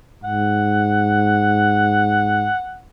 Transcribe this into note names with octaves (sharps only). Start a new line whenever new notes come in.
G#2 F#5